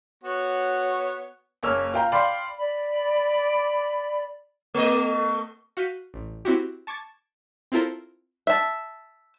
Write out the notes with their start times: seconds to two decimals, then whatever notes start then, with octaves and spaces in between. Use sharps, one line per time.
0.24 B3 F#4 C#5
1.63 F#1 A#3 C#5 E6 F6
1.94 F4 G5 A#5
2.12 D5 F5 G5 B5 C6
2.57 D5 B5
4.74 A3 D#5
5.77 F#4 F5 G6 B6 D#7
6.14 A1
6.45 C4 E4 F#4 G4
6.87 A5 C#6 D6 G#6 A6
7.72 C4 E4 F4 A4 A#4 C5
8.47 E5 A5